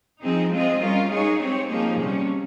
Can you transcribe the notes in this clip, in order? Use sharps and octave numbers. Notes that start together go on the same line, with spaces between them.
F3 C4 D#4 G#4
G#3 C4 F4 G#4 D#5
G3 C#4 F4 A#4
G#3 D#4 G#4 C#5
C4 G4 C#5
F3 A#3 D#4 G#4
C3 G3 C#4